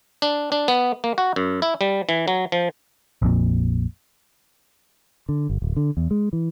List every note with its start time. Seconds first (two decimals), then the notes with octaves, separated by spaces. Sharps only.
0.22 D4
0.52 D4
0.68 B3
1.04 A#3
1.18 F#4
1.36 F#2
1.62 E4
1.81 G3
2.09 E3
2.28 F#3
2.52 F3
3.22 A#1 F2 A#2
5.29 D3
5.49 G1
5.62 D1
5.76 D3
5.97 E2
6.11 G#3
6.33 E3